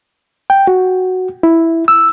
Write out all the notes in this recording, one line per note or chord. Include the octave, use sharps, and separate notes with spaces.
G5
F#4
E4
E6